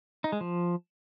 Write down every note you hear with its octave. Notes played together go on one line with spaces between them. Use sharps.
D#4
G#3
F3